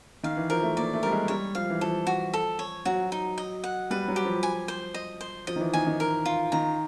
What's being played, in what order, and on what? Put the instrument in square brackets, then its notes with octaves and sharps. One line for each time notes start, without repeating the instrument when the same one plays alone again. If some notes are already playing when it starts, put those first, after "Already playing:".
[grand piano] D#3 [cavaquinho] F5
[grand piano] E3
[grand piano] F3 [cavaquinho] A#4
[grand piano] A3
[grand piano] A#3 [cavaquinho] D5
[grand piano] A3
[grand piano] G3 [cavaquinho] A#4
[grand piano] G#3
[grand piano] G3 [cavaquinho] C#5
[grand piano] F3 [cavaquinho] F5
[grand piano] E3
[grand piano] F3 [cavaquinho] A4
[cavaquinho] F#4
A4
C#5
[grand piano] F#3 [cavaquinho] F#4
[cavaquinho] D#4
D#5
F#5
[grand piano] G3 [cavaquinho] B4
[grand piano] F#3
[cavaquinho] G4
[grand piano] F3
[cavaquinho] G#5
C5
D#5
C5
[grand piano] F3 [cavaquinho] D#5
[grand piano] D#3
E3
[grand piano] D#3 [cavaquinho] G#5
[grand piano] D#3
[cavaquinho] A#4
F4
[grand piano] D#3 [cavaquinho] A#5